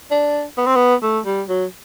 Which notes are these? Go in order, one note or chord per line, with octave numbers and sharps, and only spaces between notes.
D4
B3
C4
B3
A3
G3
F#3